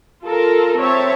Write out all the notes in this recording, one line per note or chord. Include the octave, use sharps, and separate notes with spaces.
F4 A4 A#4
C4 C#5 E5 A5